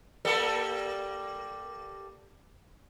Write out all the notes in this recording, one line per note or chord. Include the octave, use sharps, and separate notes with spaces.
G3 A#3 A4